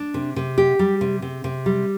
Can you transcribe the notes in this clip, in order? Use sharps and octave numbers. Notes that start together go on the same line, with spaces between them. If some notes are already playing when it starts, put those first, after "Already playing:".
Already playing: D4
C3
C3
G4
G3
C3
C3
C3
G3